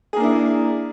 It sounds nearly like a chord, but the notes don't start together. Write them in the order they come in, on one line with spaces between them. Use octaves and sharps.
G#4 A#3 D4 E4